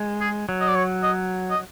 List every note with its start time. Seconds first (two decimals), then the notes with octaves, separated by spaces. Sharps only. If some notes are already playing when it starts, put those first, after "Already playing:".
Already playing: G#3
0.21 G#4
0.49 F#3
0.61 D#5
0.68 D5
0.75 C#5
1.03 D#5
1.50 D#5